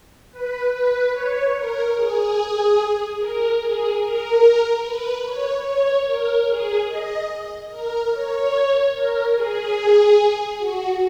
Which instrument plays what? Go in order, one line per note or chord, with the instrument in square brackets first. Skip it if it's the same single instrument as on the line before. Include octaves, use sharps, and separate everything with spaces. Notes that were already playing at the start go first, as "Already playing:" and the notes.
[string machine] B4
B4
C#5
A#4
G#4
A#4
G#4
A#4
B4
C#5
C#5
A#4
G#4
D#5
A#4
C#5
A#4
G#4
F#4